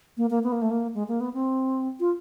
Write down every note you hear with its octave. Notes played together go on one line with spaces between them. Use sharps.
A#3
A#3
B3
A#3
A3
A#3
G#3
A#3
B3
C4
F4